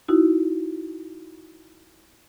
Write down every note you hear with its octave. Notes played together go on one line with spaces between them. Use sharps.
D#4 E4 F#4